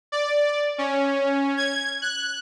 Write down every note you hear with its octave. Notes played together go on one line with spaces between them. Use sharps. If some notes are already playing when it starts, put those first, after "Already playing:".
D5
C#4
G#6
F#6